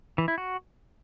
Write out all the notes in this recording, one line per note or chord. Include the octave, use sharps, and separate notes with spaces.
E3
E4
F#4